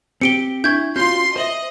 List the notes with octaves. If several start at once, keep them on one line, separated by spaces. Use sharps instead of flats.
C4 G4 C#7 D7 G7
D4 E4 C#6 G6 G#6
C#4 F4 F#4 C6 G6
C5 D#5 E5 F#7 G7